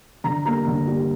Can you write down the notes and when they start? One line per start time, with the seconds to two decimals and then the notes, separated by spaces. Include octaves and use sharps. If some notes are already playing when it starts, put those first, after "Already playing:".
0.24 D3 A#5
0.45 G3 A#3 A#5
0.67 D3
0.88 G3 A#3